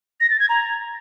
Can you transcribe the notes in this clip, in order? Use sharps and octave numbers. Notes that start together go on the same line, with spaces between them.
A#6
A6
G#6
A#5